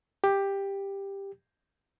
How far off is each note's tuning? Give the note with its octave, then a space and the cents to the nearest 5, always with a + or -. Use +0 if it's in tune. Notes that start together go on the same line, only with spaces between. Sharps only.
G4 +10